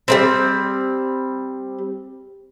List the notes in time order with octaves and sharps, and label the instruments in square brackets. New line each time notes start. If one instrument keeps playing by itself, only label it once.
[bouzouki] G3 A#3 C4